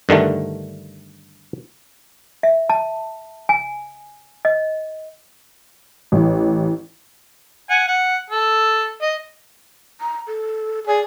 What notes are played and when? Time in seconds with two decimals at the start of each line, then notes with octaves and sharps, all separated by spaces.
0.09 G2 D3 D#3 A3
2.43 E5
2.70 A5
3.49 G#5
4.45 D#5
6.12 A1
7.70 F#5 G#5
7.88 F#5
8.30 A4
9.02 D#5
10.01 A#5
10.27 A4
10.87 G#4 D5